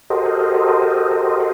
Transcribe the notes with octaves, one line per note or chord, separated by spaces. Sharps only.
F#4 G4 A4 A#4 C5 D#5